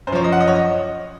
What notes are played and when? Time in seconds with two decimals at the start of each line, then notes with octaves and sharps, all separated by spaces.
0.07 F#2 C5
0.12 F3 C#5
0.24 D#5
0.32 F#5
0.40 D#5
0.47 C#5
0.55 D#5